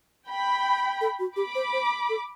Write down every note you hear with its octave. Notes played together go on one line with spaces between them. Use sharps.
G5 B5
A4
F#4
G4 B5 D6
C5
C5
A4